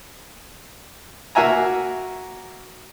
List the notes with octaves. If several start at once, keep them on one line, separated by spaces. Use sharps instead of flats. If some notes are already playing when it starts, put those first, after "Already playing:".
A#3 F#4 E5 G#5 A#5